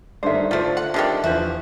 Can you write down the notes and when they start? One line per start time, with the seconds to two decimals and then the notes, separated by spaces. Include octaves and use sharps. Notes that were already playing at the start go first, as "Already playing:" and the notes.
0.23 G2 D3 D#3 A4 C5 D5 E5
0.51 D2 F3 A3 F4 C5
0.77 F#5
0.94 D3 D#3 G3 G4 A4 D5 E5 A5
1.24 E2 E3 F3 D4 F#4 E5